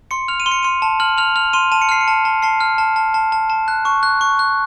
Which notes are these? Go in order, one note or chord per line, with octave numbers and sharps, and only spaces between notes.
C6 C#7
F6 F7
D#7
C6
C#7
C6 D#7
A5
F6 F#7
F6 F7
F6 F7
C6 D#7
A5 D#7
C#7
F6 C7
C#7
A5
A5
A5 C7
F6
A5
A5
A5
A5
A5
F#6
C#6
F#6
C#6
F#6